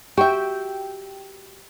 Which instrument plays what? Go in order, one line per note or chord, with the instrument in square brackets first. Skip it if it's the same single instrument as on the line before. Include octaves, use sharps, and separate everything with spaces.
[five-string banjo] F#4 E5 [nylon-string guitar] G4 [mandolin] G5